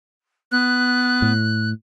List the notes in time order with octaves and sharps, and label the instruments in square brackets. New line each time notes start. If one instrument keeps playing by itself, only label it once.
[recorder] B3 [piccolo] F#6
[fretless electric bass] A2